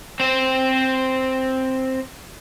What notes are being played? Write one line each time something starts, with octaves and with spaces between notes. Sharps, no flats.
C4 C5